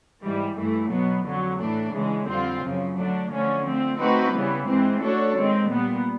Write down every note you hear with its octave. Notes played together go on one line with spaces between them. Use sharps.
G#2 E3 G3
G2 E3 A3
B2 F#3 B3
F2 D3 F#3
A2 E3 A3 D4
C#3 E3 G#3
F2 D3 G3 C4 F4
F#2 C#3 F3
D3 F#3 A3 D4
D3 F3 A3 C#4
F3 A3 C4
A3 C4 D#4 F#4 B4
C#3 E3 G3 B3
G#2 E3 G#3 C4
A3 D4 F#4 A4 C#5
D#3 G#3 C4
A#2 G3 B3